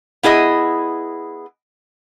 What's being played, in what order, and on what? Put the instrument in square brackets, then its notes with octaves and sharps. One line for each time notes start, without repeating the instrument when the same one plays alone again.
[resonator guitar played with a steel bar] B3 E4 G#4 D#5